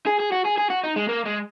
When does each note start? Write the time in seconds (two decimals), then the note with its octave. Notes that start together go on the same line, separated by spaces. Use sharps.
0.06 G#4
0.19 G#4
0.32 F#4
0.45 G#4
0.57 G#4
0.70 F#4
0.84 D#4
0.96 G#3
1.09 A#3
1.26 G#3